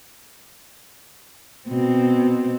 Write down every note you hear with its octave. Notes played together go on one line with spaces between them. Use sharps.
B2 C4